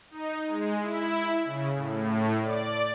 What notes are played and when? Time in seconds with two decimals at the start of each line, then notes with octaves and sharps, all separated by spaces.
0.11 D#4
0.47 G#3
0.79 E4
1.45 C#3
1.74 A2
2.42 D5